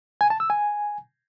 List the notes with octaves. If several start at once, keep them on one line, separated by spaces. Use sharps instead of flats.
G#5
A5
E6
G#5